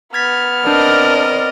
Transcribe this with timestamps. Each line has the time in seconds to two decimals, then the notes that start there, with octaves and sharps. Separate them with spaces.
0.14 B3 F6 G#6 A6 B6
0.67 C4 D4 A#4 D5 D#5